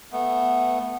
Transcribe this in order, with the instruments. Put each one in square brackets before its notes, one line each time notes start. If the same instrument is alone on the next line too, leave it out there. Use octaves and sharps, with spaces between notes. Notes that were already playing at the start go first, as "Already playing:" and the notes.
[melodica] A3 B3